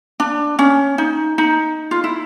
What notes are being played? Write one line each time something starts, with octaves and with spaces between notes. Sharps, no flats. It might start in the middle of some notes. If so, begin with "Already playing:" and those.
D4
C#4
D#4
D#4
F4
E4